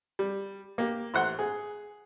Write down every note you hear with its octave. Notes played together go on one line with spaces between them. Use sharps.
G3
A#3 G4
A1 C5 F#5 C6
G#4